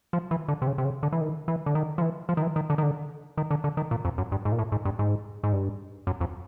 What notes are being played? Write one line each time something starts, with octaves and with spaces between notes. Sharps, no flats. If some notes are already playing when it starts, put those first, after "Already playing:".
F3
E3
D3
C3
C#3
C3
C#3
D3
E3
D#3
E3
D3
D#3
F3
E3
F3
D#3
E3
D#3
D3
D#3
D3
D#3
D3
D3
D#3
A#2
F2
F#2
G2
G#2
A#2
A2
G#2
G2
G#2
G#2
G2
F#2
F2